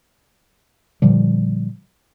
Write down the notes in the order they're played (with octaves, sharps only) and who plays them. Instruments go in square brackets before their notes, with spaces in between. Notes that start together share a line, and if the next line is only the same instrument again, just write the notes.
[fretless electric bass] A#2 D3 F3 G3